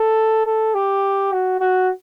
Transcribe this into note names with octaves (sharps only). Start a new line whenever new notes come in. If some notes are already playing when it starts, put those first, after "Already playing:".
Already playing: A4
A4
G4
F#4
F#4